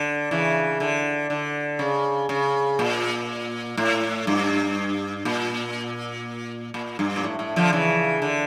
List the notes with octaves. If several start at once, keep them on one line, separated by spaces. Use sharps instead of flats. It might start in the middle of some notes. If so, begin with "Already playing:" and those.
Already playing: D3
C#3 E3
D3
D3
C#3
C#3
A#2
A2
G2
A#2
A#2
G2
A#2
A2
A2
D3 F3
C#3 E3
D3